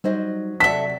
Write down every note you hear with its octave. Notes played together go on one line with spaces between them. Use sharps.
F#3 G3 D#4 C5 D#5
C3 F#3 A4 D5 E5 F#5 B6